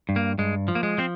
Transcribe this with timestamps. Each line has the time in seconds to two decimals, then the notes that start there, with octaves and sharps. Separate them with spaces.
0.09 G2
0.16 A#3
0.38 G2 G#3
0.68 F3
0.75 A#3
0.83 G#3
0.98 F3 C4